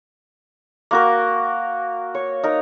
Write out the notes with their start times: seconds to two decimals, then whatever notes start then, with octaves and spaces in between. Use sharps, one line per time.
0.91 A#3 F#4 A#4
2.15 C#5
2.43 D#4 A#4